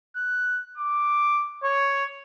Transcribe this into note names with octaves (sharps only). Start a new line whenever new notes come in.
F#6
D6
C#5